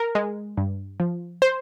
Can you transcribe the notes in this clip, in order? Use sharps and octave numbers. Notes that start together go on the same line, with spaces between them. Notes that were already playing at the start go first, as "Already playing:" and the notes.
Already playing: A#4
G#3
G2
F3
C5